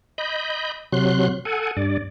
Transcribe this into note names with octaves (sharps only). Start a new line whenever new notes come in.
D#5 B5 G6
C3 F#3 C6 F#6
A4 F#5 G#5
G2 D5